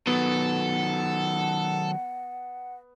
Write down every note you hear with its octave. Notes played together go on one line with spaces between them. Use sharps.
D#3 F#3 B3 A4 F#5